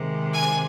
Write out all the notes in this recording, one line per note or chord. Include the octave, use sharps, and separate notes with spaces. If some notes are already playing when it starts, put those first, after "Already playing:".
Already playing: C3 D#3 G#3
G#5